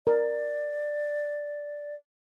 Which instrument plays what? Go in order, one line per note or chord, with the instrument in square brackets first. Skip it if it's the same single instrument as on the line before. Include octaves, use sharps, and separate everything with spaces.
[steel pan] A#4 [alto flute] D5